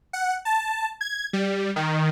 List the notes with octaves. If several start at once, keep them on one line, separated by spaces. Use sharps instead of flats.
F#5
A5
G#6
G3
D#3